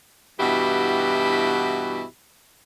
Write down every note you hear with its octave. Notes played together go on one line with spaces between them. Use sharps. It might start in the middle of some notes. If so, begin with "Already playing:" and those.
G2 B2 E3 E4 F#4 G4